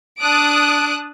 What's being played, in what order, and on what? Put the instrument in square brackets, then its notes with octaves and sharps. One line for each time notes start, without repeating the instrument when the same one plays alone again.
[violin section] D4 A5 D#6 F#6 D7